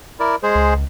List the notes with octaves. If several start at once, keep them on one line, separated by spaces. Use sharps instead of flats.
E4 A#4 D5
G#3 G#4 C5
C#2